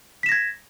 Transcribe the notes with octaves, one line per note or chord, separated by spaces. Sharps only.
G#6 A#6 B6 E7